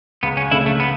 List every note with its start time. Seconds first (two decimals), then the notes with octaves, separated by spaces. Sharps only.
0.23 C#2 B3
0.37 C#4
0.51 C#3 A3 E4
0.66 A3
0.80 B3